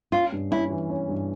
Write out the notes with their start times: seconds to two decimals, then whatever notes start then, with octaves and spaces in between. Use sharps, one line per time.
0.12 C#4 F4
0.32 G2
0.51 C#4 E4
0.70 E3
0.90 C#4
1.09 G2